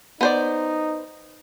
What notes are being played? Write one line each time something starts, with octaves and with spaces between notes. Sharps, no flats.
B3 D#4 C5 D5